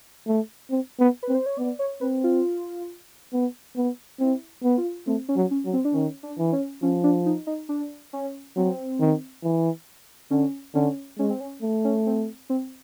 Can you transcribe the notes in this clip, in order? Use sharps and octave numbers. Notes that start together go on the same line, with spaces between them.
A3
C4
B3
B4
C4
C5
C#5
B3 D5
C#5
C4 B4
F4
B3
B3
C4 E4
B3
F4
A3 C4
C#4
F#3
C#4
F#3
C4
D4
D#3 C#4
D4
E3
C#4
F3 C#4
D4
D#4
D#4
D4
C#4
F#3 C4
D#3
E3
D3 C#4
D3 C#4
G#3 C#4
C4
C#4
A3
C#4
C4
C4